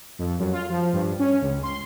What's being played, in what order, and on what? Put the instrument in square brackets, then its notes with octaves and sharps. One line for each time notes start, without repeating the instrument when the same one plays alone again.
[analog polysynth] F2
F#2
F4
F3
G2
C#4
C#2
C6